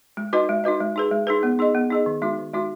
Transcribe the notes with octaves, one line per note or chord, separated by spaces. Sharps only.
G#3
D#4 F#4 B4 D#5
G#3
D#4 F#4 B4 D#5
G#3
D#4 G#4 B4
G#3
D#4 G#4 B4
B3
D#4 G#4 D#5
B3
D#4 G#4 D#5
D#3
G#3 D#4 F#4
D#3
G#3 D#4 F#4